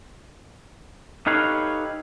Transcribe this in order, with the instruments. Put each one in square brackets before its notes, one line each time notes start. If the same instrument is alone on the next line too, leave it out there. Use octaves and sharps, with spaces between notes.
[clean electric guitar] D#4 G4 A4 B4 C#5 F5